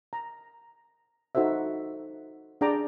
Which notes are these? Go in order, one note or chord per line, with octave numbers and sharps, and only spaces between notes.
A#5
D#4 F#4 A4 C5 E5
D4 G#4 D5 G5 A#5 D6